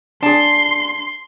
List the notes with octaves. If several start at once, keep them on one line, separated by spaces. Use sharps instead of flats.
D4 G#4 A5 C6